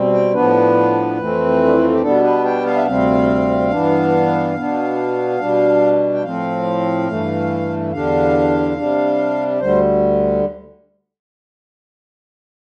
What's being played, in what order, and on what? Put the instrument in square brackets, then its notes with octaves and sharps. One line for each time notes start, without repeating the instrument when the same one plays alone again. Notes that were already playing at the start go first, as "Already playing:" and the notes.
Already playing: [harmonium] B2 G3 C4
G5
A2 F3 B3 D4 B4
F2 E3 A3 C4
D4
E4
F4
G4
B2 G3 B3 D4 A4
B4
G5
F5
E5
D2 C3 G3 C4 F5
G2 E3 B3 D4
B2 B3 D4
B2 G3 D4
G5
A2 F3 C4 F5
G2 E3 A3
E2 D3 G3 D4 F5
C3 G3 D4
D2 D3 G3 C5